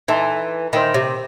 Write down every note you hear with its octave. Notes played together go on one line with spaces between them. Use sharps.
E3 D#4 A4 E5 A5 C6
D#3 C5 E5 G5 B5
C3